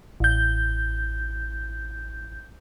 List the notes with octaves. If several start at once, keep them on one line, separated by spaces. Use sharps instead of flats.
A1 G6